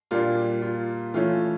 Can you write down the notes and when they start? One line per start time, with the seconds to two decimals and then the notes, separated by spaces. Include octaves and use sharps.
0.11 A#2 G3 A#3 D4 F4
0.62 F4
1.14 E3 A3 C#4 F4